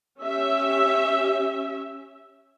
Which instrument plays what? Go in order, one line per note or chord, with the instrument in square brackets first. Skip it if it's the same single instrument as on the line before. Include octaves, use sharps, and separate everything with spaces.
[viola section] C#4 G4 E5